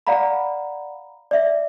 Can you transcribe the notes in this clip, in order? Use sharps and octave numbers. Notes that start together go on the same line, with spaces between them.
D5 F5 F#5 A#5 B5
D5 E5